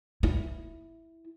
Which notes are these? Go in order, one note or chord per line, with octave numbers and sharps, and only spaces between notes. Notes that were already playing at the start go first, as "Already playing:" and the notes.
E4